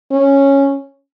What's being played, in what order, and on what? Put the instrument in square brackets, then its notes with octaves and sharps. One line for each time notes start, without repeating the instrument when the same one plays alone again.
[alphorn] C#4